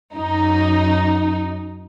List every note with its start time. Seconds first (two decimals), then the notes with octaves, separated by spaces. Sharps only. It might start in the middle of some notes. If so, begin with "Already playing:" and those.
0.15 F#2 D#4